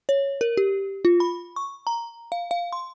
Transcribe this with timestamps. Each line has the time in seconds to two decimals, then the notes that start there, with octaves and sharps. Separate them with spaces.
0.09 C#5
0.41 A#4
0.57 G4
1.05 F4
1.20 B5
1.56 C#6
1.87 A#5
2.32 F5
2.51 F5
2.73 C6